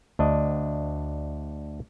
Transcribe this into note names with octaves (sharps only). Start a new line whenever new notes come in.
D2 D4 D#5